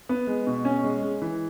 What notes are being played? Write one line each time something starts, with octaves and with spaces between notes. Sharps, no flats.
B3
G#3
B2
C#4
G#3
G#3
E3